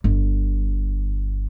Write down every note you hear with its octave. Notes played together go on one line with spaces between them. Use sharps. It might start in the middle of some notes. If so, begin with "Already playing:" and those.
G1